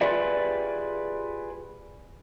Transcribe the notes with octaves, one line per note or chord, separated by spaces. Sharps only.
F4 G4 G#4 B4 D5 E5